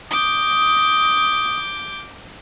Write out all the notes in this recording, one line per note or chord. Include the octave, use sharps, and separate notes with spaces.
D6 D#6 G6